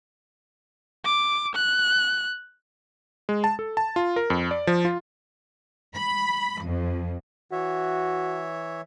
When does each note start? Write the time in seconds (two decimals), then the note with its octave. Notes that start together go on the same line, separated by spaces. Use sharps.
1.05 D6
1.55 F#6
3.29 G#3
3.44 A5
3.59 A4
3.77 A5
3.96 F4
4.16 A#4
4.30 F2
4.51 D5
4.67 F3
4.85 F4
5.96 B5
6.65 F2
7.52 E3 F#4 C#5 E5